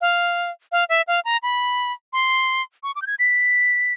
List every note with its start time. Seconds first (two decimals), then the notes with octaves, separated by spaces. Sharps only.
0.01 F5
0.72 F5
0.89 E5
1.08 F5
1.25 A#5
1.43 B5
2.13 C6
2.83 C#6
2.96 D6
3.02 G6
3.07 G#6
3.19 B6